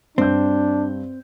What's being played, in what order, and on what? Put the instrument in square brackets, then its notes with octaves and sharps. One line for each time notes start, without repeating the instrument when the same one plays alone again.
[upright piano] G2 G6 [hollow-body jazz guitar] C4 [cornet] D4